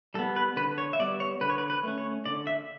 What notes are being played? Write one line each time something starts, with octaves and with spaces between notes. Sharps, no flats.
G3 B3 A4
B4
D3 B4
C#5
E5
G3 B3 D5
C#5
D3 B4
C#5
B4
B4
A3 C#4
C#5
D3 D5
E5